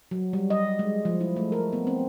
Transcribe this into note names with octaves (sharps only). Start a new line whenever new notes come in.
F#3
G3
D#5
G#3
F3
E4
A3
A#4
B3
C4